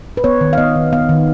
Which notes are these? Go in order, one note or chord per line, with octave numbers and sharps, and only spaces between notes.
B4
B3 C#5
D#3
F5
B3 D#5
D#3
B3 F5
D#3